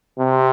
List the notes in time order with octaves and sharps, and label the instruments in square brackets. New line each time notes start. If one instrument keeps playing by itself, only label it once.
[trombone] C3